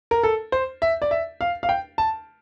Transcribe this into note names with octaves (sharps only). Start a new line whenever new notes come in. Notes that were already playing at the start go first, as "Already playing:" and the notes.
A#4
A4
C5
E5
D5
E5
F5
F5
G5
A5